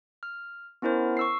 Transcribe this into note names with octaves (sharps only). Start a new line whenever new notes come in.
F6
B3 C#4 E4 A#4 C5
C#6 E6 C7